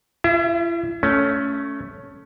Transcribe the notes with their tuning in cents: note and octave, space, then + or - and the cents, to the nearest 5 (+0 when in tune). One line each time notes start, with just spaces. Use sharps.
E4 +45 E5 +0
A3 +0 C#4 +15